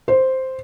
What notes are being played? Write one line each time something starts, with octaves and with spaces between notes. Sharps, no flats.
C5